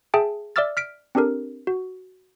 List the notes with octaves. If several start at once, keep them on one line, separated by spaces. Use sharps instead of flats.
G#4 E5 G5 A5
D5 E5 D6 E6 F6 A6
F6 B6 D7
C4 D4 G4 A4 A#4
F#4